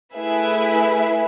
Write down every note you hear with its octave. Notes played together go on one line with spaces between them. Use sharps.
A3 E4 G#4 B4 E5